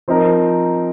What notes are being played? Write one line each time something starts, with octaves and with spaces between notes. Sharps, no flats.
F3 C4 D#4 A#4